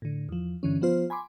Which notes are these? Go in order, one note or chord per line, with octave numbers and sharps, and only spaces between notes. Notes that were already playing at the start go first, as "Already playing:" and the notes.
A2 D3
E2 F3
G2 D3 E3 C#4
F3 B3 F4 C5
G#5 B5 C6 D6